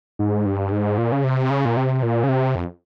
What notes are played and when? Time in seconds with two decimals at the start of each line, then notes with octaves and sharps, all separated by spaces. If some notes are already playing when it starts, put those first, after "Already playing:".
0.19 G#2
0.46 G2
0.72 G#2
0.98 A#2
1.12 C#3
1.24 C3
1.50 C#3
1.65 A#2
1.77 C3
2.03 A#2
2.24 C#3
2.29 C3
2.55 F2